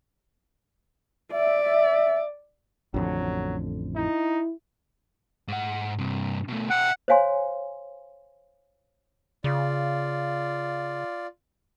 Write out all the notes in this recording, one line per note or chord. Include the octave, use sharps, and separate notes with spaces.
D5 E5
A1 F2 D3 F#3
D#4 E4
G#2 F#5
G2 C3
B2 A3
E5 F#5 G5
C5 C#5 F5 G#5 C6
C#3 F4 D5